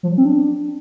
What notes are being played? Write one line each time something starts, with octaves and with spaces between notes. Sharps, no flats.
F3
F#3
C4
D4